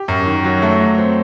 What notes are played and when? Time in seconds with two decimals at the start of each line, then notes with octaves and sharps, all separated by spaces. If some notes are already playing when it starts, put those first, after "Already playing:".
Already playing: G4
0.08 F#2
0.26 D#3
0.44 F#3
0.62 A3
0.80 F#3
0.98 C4